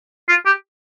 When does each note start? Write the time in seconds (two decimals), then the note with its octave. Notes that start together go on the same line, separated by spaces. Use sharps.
0.29 F4
0.46 G4